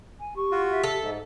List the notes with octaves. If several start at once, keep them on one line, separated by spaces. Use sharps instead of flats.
G#5
G4 C#6
F4 F#4
E5
A4
G#2